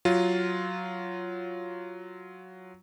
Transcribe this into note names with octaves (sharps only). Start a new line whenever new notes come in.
F#3 F4